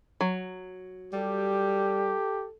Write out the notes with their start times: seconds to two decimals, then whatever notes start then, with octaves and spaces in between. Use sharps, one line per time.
0.21 F#3
1.13 G3 G4 A4